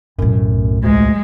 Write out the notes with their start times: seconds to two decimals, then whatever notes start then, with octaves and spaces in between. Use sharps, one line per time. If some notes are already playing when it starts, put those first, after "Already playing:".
0.19 B1 F#2 A2
0.84 D2 G#3